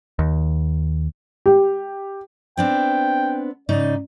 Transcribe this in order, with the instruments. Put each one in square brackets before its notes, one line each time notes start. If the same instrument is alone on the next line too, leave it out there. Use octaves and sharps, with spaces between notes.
[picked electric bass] D#2
[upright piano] G4
[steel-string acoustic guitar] B3 C4 D4 [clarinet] G5
[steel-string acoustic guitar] G#2 C#3 D#4 [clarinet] D5